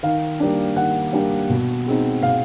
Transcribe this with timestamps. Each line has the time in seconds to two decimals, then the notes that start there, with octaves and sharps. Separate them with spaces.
0.03 D#3 F5
0.40 G3 A#3 D4
0.76 D#3 F#5
1.13 G3 A#3 D4
1.50 B2
1.86 G#3 C4 D#4
2.23 B2 F5